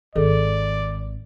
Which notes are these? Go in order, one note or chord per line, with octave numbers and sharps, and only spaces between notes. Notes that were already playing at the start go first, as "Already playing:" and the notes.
G#1 D#3 G#4 A4 D5